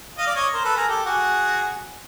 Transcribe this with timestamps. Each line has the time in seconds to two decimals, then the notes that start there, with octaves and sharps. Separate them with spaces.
0.18 D#5 F5
0.27 D5
0.35 C#5 D#5
0.54 A#4 C5
0.64 A4 B4
0.76 G#4 A#4
0.89 G4 A4
1.06 F#4 G#4